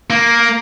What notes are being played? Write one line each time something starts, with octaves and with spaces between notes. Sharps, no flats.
A#3